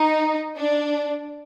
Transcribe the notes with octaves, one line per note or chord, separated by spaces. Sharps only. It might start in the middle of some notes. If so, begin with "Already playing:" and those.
Already playing: D#4
D4